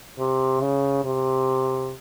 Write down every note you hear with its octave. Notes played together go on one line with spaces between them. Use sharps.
C3
C#3
C3